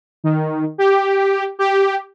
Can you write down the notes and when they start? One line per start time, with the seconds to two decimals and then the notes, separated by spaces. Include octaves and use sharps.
0.24 D#3
0.78 G4
1.59 G4